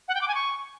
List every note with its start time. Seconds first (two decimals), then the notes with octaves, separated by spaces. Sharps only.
0.08 F#5
0.15 G5
0.21 D6
0.28 G#5
0.34 C#6